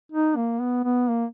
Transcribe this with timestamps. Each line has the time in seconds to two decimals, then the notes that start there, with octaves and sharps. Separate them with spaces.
0.12 D#4
0.36 A#3
0.60 B3
0.84 B3
1.09 A#3